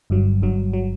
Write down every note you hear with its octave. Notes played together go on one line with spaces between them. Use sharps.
G1 G2 F#3
G1 G2 F#3
F#3